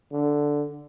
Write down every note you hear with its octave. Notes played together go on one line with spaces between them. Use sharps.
D3